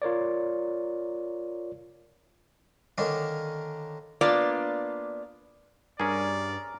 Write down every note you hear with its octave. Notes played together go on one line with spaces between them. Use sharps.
F4 A#4 C#5 D5
D3 D#3 A#3 C#4 D4
A#3 B3 D4 F4 D5
G2 C#4 G#4 A#4 D5